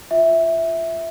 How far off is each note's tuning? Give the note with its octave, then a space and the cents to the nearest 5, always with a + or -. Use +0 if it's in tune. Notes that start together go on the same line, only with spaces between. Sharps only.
F4 +0 E5 -5